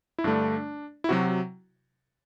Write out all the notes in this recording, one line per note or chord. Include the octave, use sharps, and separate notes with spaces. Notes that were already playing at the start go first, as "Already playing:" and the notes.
E4
G2 D3 A3 D4
E4
C3 F#3 F#4